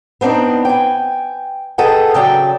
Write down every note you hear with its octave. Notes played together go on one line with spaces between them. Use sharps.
B3 C4 D4 D#4
G5 G#5
G#4 A4 B4 D#5 F#5 G5
C#3 F#3 D5 E5 G5